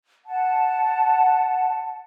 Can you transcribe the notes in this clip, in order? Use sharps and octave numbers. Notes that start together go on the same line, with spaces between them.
F#5 A5